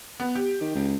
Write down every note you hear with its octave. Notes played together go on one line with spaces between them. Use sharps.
B3
G4
D#3
C#2